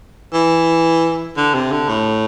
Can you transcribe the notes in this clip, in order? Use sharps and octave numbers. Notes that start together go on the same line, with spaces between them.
E3
D3
C3
D3
A2